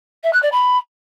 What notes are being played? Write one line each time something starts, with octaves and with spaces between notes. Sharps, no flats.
E5
F#6
D5
B5